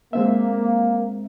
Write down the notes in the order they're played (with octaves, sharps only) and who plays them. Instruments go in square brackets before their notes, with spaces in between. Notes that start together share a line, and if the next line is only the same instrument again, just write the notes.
[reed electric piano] G#3 C4 E5 [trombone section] A#3